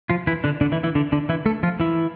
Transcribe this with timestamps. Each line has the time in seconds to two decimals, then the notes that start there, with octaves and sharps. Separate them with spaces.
0.10 F3 F4
0.27 E3 E4
0.44 D3 D4
0.61 D3 D4
0.72 E3 E4
0.83 E3 E4
0.95 D3 D4
1.12 D3 D4
1.29 E3 E4
1.46 A3 A4
1.63 F3 F4
1.80 E3 E4